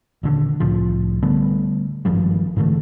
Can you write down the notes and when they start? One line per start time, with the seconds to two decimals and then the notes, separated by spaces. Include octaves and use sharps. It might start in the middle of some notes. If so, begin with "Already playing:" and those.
0.23 D#1 D3
0.60 C2 A2 F3
1.22 D3 G3 A3 B3
2.05 G#1 G2 F3 G3
2.57 G#2 D3 E3 A3